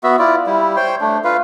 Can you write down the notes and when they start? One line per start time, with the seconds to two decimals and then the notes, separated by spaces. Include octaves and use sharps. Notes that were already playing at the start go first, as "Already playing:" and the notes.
0.04 B3 F#4 E5
0.19 E4 F4 D5
0.46 G3 E4
0.76 C5 C#5 G5 C6
1.01 A3 D4
1.24 F4 B4 F5